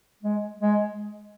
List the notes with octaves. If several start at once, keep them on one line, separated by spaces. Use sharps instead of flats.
G#3
G#3